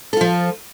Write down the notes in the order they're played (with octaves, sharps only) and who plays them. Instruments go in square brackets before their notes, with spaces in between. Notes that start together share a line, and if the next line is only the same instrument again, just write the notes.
[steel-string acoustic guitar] A4
F4
F3